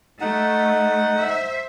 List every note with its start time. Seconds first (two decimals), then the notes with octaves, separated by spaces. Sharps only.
0.21 A3 D#4 F#5
1.19 C5 E5